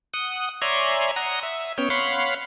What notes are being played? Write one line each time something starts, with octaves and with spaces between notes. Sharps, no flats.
F#5 D#6
C#5 D5 E5 G#5 A#5 C6
F#5 A#5 D#6
E5
B3 C#4 C#5 G5
C#5 F5 F#5 B5 C6